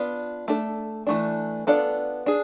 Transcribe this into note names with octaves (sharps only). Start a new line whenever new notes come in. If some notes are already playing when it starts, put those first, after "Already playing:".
Already playing: B3 D4 F4
A3 D4 A4
E3 A3 D4
B3 D4 F4 A4 D5
D4 G#4